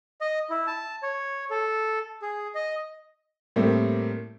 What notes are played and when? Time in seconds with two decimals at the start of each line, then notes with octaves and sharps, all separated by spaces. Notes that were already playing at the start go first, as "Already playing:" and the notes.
0.21 D#5
0.50 E4
0.67 A5
1.03 C#5
1.51 A4
2.22 G#4
2.55 D#5
3.56 A2 G3 A3 A#3 C4